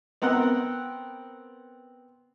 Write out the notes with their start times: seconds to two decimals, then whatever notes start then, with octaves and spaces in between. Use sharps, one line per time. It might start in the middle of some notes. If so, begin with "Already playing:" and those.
0.22 B3 C4 A#4 F#5